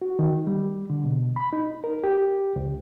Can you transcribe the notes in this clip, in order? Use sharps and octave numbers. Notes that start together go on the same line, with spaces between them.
F#4
D#3
G3
D3
B2
B5
D#4
A#4
G4
C#2